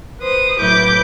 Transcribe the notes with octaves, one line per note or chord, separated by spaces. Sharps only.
B4 C5 D#6
A2 F#3 E4 B4 D6 G6